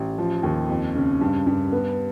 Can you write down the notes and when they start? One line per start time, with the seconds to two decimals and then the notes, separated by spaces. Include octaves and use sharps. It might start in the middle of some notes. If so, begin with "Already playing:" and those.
Already playing: A1
0.18 F3
0.43 D#2
0.70 F2
0.95 C#3
1.21 G2
1.47 G2
1.72 B3